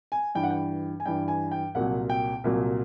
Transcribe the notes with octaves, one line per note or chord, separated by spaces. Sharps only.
G#5
G2 E3 G5
F#5
G5
G#5
G2 E3 G5
G#5
G5
C2 A#2 F#3 F#5
G5
C2 A#2 F#3